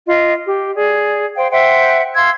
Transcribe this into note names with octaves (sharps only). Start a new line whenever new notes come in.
F4 D#5
G4
G#4 D5
C5 F5 G5
C5 E5 F#5 G5
F5 C6 E6 G#6